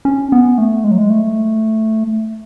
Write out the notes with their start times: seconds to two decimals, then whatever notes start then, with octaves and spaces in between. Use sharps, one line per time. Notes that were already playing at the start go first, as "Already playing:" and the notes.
0.05 C#4
0.32 B3
0.58 A3
0.84 G#3
0.91 F#3
0.98 G#3
1.10 A3